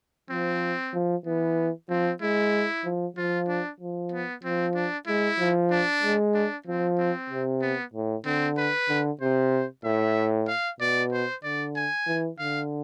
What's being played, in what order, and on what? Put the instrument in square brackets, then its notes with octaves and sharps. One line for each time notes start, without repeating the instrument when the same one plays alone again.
[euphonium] F3 [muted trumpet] C4
[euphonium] F3
[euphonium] E3 [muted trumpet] B3
[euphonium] F3 [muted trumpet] C4
[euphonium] G#3 [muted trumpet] E4
[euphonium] F3
[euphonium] F3 [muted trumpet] F4
[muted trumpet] D4
[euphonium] F3
[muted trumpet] B3
[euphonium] F3 [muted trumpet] C4
[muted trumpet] D4
[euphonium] G#3 [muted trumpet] E4
[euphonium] F3
[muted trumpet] D4
[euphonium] G#3
[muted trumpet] D4
[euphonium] F3 [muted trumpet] C4
[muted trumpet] C4
[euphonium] C3
[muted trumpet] B3
[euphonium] A2
[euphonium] D3 [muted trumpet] C4
[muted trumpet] B4
[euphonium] D3
[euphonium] C3 [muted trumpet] C5
[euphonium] A2 [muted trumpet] E5
[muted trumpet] F5
[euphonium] B2 [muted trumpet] D5
[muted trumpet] C5
[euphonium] D3 [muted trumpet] D5
[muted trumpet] G#5
[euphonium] E3
[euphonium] D3 [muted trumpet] F5